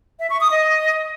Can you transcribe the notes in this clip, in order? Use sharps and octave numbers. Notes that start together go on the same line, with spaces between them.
E5
C#6
D#6
D#5